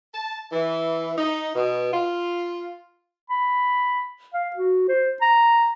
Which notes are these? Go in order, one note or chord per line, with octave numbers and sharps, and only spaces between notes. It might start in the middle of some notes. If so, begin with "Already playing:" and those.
A5
E3
D#4
B2
F4
B5
F5
F#4
C5
A#5